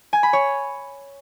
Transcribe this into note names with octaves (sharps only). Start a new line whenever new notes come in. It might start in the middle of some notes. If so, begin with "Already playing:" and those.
G#5
B5
C#5